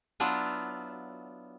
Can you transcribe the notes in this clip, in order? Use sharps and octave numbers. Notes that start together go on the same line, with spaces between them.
F#3 B3 D4 E4 F4